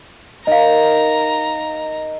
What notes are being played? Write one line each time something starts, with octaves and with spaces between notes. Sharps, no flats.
D#4 A#4 D#5 F5 A#5